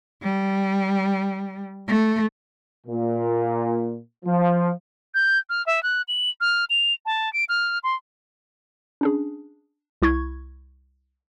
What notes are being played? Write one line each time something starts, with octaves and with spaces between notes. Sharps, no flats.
G3
A3
A#2
F3
G6
F6
E5
F#6
F#7
F6
F7
A5
D7
F6
C6
C#4 D4 G#4
C2 E4 C#6 G#6